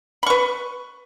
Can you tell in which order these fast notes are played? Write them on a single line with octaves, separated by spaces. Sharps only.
B5 C#6 B4